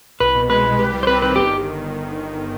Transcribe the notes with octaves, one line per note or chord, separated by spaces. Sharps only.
C2 B4
B2
G#3 B4
C2
G4
G3
C5
C4 B4
D#3 B4
G1 G4